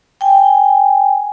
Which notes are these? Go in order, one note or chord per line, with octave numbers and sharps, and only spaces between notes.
G5 G#5